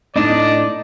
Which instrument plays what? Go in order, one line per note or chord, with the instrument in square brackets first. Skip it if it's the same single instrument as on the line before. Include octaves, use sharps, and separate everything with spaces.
[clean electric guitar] A2 D4 [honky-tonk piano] D#4 [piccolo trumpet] D5 [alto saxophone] D#5